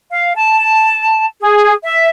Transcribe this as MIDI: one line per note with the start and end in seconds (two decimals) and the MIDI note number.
0.10 0.32 77
0.36 1.25 81
1.40 1.73 68
1.84 2.08 76